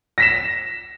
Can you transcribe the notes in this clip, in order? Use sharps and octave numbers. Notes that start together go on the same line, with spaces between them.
A#6 B6 E7